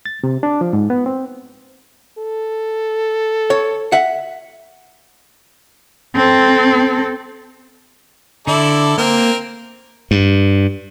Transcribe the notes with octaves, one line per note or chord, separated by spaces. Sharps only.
A6
C3
D4
F3
G#2
B3
C4
A4
C#5
E5 F#5
C4 A4
D3 E4 A4 D5
A#3 C4 A#4
G2